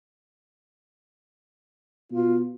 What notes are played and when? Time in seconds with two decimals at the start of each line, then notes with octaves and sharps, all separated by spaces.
2.12 B2 F4